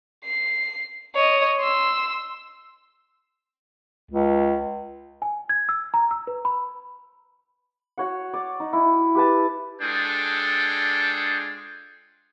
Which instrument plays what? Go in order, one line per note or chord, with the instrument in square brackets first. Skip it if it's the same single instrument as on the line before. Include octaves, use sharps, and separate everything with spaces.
[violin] C7
C#5 D#5
C6 E6
[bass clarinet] C#2
[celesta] G#5
G#6
E6
A#5
E6
B4
B5
[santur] F#4 C#5 F#5
D5
D#4
E4
G4 B4 A5
[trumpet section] G#3 D4 F4 G#4 A4 G5